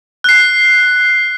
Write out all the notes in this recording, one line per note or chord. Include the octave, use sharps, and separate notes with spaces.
F#6 C7